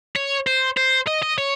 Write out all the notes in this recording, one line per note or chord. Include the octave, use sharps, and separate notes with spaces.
C#5
C5
C5
D#5
D#5
C#5